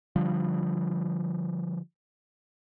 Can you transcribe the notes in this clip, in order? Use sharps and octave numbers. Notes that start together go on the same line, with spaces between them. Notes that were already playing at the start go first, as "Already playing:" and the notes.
D3 F3 G3